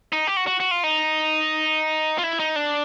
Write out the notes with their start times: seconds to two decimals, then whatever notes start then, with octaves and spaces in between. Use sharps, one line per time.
0.13 D#4
0.27 G4
0.37 F#4
0.47 F#4
0.60 F#4
0.71 F4
0.84 D#4
2.18 F4
2.24 E4
2.39 D#4
2.56 D4